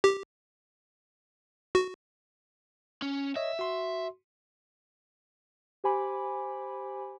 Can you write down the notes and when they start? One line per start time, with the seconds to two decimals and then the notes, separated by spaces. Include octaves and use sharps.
0.04 G4
1.75 F#4
3.02 C#4
3.36 C#5 D#5 E5
3.59 F#4 C6
5.84 G4 C5 G#5 B5 D6